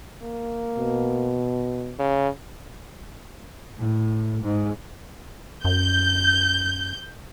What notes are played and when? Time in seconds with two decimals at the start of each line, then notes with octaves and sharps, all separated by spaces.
0.22 A#3
0.79 B2
1.99 C#3
3.77 A2
4.40 G#2
5.65 F#2 G6